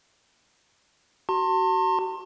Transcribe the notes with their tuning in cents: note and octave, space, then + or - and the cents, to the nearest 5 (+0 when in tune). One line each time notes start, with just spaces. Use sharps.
F#4 +30 A5 +40 C6 +30